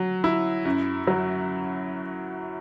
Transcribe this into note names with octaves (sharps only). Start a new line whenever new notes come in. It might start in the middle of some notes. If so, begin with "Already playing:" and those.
Already playing: F#3
E4
F#2
F#3